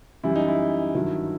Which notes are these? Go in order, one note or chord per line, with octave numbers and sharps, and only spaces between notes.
F#2 E3 G3 E4
D#4
E4
G2 D#3 F#3